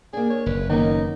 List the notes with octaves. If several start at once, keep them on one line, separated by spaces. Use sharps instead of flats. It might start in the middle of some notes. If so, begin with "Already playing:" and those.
A#3 D4 G#4
C#5
F#1 B4
D#3 A#3 B3 C#4 D#4